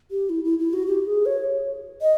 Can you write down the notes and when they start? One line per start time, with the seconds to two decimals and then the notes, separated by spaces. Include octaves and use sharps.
0.11 G4
0.30 E4
0.44 E4
0.59 E4
0.73 F#4
0.87 G4
1.07 G#4
1.26 C#5
2.02 D#5